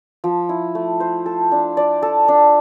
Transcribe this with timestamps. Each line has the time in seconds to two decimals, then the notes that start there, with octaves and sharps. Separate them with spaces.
0.24 F3
0.49 E4
0.75 A3
1.00 C5
1.26 A4
1.52 D4
1.77 D5
2.02 A4
2.28 D4